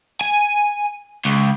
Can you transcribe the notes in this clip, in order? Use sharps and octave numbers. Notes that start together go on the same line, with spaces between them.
G#5
C#2